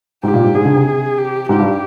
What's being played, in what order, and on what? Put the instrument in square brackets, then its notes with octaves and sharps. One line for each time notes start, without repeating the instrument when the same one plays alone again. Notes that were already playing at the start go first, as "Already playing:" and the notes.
[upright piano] G#2 [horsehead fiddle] G4
[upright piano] A#2
G#2
[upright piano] G#2 [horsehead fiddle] G#4
[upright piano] D3
C3
[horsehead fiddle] G4
[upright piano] G#2 [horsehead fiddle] G4
[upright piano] G2